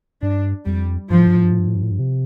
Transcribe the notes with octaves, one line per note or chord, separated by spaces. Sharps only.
G2 D4
F2 G3
G2 F3
A2
G2
A2
G2
A2
G2
A2
G2
A2
G2
C3